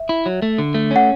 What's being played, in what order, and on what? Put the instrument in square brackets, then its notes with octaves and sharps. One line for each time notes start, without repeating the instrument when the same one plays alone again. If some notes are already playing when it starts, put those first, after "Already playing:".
Already playing: [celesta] E5
[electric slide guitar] E4
F#3
A3
D3
A3
[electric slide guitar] C#4 [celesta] F#5